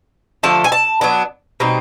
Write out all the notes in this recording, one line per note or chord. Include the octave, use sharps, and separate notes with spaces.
D3 F3 A3 A5
G#5
A5
F#3 B3 D4
B2 G3 C4 D#4